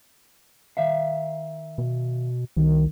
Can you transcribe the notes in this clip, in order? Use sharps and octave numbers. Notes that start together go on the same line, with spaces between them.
D#3 E5 F5
B2
C2 D#3